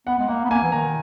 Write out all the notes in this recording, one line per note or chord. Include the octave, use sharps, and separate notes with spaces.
B3 F#5
G#3
A#3 F#5
B3
A#3 G#5
E3
D#3 A#5